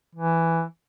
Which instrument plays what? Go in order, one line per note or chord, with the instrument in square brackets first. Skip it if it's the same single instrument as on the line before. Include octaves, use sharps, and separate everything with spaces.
[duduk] E3